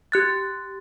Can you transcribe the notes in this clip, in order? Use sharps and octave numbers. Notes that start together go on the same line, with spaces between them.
G4 F#6 A6